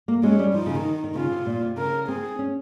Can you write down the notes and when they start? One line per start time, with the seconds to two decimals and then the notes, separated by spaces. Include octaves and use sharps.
0.08 A#3
0.23 G#3 C#4
0.39 G3
0.54 F3 D#4
0.66 C#3
0.75 D#3
1.04 D#3
1.15 C#3 F4
1.32 C3
1.46 A#2
1.62 C3
1.77 C#3 A#4
2.08 C4 G#4
2.39 C#4